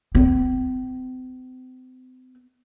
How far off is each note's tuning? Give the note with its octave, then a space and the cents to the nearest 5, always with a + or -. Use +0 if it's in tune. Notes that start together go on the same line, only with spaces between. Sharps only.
C4 -40